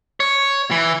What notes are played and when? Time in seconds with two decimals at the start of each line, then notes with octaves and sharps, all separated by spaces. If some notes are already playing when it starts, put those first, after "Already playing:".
0.20 C#5
0.71 E3